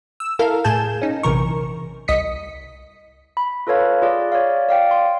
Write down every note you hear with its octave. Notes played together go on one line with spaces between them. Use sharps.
E6
E4 A4 A#4 F5
A2 G#4 G#5 A5 G6 E7
C#4 D#4
A#1 F#2 C3 E3 A#4 C#6
C2 D#5 D#6 B6 C#7
B5
F4 A4 B4 C#5 F5
F4 G#4 D5
C#5 D5 F5
D5 F5 G5
C6